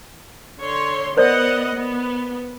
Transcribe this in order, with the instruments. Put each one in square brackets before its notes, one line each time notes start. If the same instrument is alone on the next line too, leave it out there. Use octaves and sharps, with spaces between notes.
[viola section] D3 C#5 C6
[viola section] B3 D#5 F#5 [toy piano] A#4 C5 D5
[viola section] B3